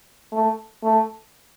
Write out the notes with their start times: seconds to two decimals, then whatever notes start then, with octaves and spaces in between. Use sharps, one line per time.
0.32 A3
0.83 A3